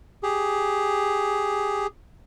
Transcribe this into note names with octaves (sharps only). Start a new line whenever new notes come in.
G4 G#4